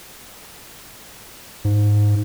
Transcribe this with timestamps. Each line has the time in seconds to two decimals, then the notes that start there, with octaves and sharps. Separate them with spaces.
1.65 G#2